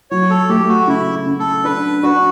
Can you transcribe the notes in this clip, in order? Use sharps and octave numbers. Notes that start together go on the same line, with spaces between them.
F#3 C#5
A4
A3 G4
F#4
C#3 E4
C#3
A4
D4 B4
D4 F#4